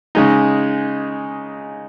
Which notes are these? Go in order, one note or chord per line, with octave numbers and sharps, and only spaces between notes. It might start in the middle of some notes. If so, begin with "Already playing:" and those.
C#3 G#3 D#4